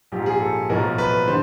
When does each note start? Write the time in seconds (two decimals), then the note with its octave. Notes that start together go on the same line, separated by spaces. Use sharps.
0.12 A#1 G#2 F3 G4
0.26 G#4
0.41 A4
0.69 B1 A2 F3 A3 A#4
0.98 B4
1.28 D3 C5